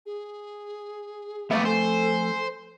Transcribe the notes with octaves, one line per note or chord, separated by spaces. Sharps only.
G#4
F2 A3 B3 D5 E5 F5
A4 C5 G#5